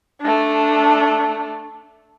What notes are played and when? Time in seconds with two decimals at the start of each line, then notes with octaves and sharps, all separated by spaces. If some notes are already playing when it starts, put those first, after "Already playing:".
0.21 A3 D4